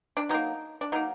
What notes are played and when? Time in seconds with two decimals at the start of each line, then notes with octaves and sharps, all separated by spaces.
0.17 D4
0.29 F#3 A#3 D#4
0.81 D4
0.92 F#3 A#3 D#4